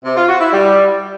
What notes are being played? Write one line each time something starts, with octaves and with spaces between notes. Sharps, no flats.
C3
F4
F#4
E4
G3